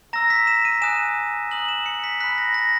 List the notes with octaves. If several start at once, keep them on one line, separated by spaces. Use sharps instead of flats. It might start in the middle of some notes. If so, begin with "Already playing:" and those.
A#5 E6 A#6
B6
E7
D#7
G#5 D#6 F#6 E7
A#5 D#6 F#6 F#7
E7
C#7
B6
B5 F#6 B6
A#6
A#6